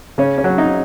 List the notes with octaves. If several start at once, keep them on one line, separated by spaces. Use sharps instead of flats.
C#3 C#4
C#4
F#3
D#4